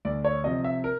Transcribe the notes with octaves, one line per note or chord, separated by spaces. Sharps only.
D2 D5
C#5
C3 F3 D#5
E5
A#4